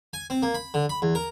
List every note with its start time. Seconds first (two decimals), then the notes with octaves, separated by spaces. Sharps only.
0.13 G#5
0.30 C4
0.42 A#3
0.55 B5
0.74 D3
0.89 B5
1.02 E2
1.15 A#4